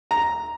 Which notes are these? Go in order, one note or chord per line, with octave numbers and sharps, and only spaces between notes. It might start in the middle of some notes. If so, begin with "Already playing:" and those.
A#5